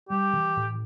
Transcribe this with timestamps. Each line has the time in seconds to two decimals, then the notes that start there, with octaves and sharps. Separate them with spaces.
0.09 G3 G4
0.33 E3
0.56 A2